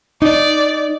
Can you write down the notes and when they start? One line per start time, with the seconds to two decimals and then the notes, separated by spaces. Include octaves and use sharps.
0.22 D#4 D5